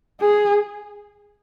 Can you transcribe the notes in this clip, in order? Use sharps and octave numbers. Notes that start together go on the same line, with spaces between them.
G#4